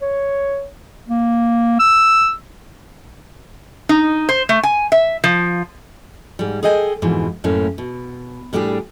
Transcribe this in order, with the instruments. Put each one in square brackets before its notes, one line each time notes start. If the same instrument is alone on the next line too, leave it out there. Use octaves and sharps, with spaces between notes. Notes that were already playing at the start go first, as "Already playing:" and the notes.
[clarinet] C#5
A#3
E6
[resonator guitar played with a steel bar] D#4
C5
A3
G#5
E5
F3
[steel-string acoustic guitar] G#2 G3
G#4 A4 D#5 G5 G#5
F2 G#2 B2 E3
F#2 A2 A3 A#3 C#4
B2
A2 G3 D4 G4 G#4